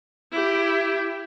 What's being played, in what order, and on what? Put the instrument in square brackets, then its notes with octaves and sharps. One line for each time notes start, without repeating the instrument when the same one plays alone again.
[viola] E4 G4